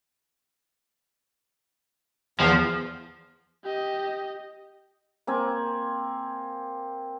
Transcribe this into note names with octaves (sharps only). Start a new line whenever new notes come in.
E2 F3
G4 D#5
A#3 C4 G#5